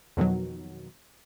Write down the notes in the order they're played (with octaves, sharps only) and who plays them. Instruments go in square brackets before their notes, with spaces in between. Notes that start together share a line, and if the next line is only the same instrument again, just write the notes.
[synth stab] F2 B2 D#3 F#3